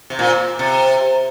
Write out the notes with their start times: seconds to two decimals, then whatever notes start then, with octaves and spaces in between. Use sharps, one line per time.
0.10 C3
0.19 A#2
0.59 C3